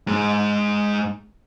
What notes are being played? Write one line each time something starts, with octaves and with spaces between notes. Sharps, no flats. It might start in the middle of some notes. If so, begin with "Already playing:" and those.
G#2 G#3